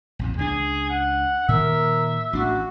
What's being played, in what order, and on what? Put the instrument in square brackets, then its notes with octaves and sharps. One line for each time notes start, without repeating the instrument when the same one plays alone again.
[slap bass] A#1 F2 G#2
[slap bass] C#2 D4 [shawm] G#4
[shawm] F#5
[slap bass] A#2 D#3 [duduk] A#4 [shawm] E5
[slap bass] A1 D4 [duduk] F#4